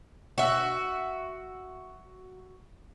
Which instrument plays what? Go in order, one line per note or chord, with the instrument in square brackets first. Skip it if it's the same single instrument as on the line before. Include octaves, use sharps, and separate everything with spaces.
[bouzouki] F#4 E5